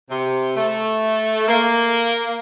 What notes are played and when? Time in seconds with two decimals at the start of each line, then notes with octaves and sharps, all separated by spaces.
0.10 C3
0.55 A3
1.47 A#3